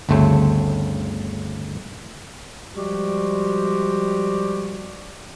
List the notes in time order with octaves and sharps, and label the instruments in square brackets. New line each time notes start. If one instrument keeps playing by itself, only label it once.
[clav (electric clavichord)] G1 D2 C#3 A3 C4 C5
[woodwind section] F3 G3 G#3 F#4 G4